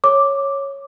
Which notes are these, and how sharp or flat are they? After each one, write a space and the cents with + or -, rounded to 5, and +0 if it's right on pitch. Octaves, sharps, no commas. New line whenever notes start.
C#5 -5 D6 +0